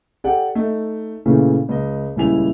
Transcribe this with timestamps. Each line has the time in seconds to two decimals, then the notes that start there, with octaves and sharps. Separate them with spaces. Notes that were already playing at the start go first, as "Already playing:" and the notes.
0.24 G4 A4 D5 F#5 G5
0.55 A3 D#4
1.26 A#2 C#3 E3 A3 C#4
1.69 C#2 D#5
2.16 D#1 C#2 C#4 E4 G#5 F7